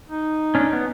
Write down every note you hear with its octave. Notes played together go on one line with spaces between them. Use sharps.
D#4
C#4 D4
B3